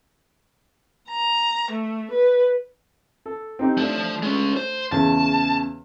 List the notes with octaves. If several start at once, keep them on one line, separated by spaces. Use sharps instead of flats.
A#5
A3
B4
A4
C4 D#4 G4
F3 A3 D4
G#3 C#4
C5
E2 C#3 C#4 A5